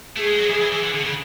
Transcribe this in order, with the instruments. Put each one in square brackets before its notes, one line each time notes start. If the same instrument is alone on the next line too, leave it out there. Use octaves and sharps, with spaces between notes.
[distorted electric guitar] A3 [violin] G#4
[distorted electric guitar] G#3
F#3
E3
E3
E3
D3
D3
C#3